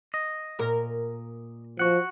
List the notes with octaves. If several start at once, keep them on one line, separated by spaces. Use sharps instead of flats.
D#5
A#2 A#4
F3 F#4 F#5